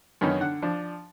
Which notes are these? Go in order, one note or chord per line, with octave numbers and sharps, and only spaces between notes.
F#2 D3 D#3 B3 C#4 D#4
D3 F#5
F3 D4